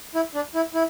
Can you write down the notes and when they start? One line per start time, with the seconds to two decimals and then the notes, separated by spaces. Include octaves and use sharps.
0.15 E4
0.34 D4
0.55 E4
0.74 E4